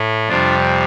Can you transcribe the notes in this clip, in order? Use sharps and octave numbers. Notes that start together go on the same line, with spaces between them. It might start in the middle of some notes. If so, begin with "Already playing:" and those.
Already playing: A2 A3
F2 C3 G3 D4 F4